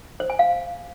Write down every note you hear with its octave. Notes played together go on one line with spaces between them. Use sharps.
C5
G#5
F5